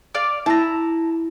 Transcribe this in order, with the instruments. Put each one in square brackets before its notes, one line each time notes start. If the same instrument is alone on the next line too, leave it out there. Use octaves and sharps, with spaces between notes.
[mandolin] D5 F5
[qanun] E4 [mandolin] A5 A#5